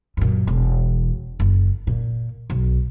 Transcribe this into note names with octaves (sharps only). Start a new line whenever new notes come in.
F#2 A#2
E1
F#1
A#2
B1